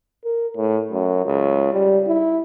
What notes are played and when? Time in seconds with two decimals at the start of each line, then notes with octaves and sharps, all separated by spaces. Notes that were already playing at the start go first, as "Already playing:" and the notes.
0.24 A#4
0.56 A2
0.91 F#2
1.26 C#2
1.73 G3
2.08 E4